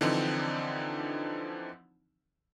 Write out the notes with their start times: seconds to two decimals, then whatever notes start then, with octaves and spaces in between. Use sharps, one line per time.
0.01 D3 E3 F3 C4 D4 D#4